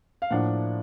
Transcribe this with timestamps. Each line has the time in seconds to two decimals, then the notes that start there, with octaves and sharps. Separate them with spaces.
0.22 F5
0.31 A2 F3 A#3 D4 F#5